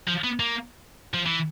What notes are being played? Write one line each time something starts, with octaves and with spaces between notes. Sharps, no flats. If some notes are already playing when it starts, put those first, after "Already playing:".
F3
B3
A#3
F3
E3